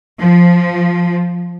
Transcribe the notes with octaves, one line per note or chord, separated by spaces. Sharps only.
F3